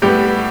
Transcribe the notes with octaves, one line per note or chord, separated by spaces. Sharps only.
A2 G3 B3 G4